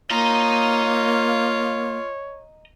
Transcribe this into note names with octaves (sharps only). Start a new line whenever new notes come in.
A#3 F4 C#5 D#5 A#5